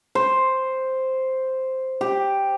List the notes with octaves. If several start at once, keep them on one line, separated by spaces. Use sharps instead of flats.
C5
G4